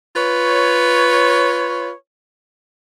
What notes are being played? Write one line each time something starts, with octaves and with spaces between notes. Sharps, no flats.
F4 B4 C#5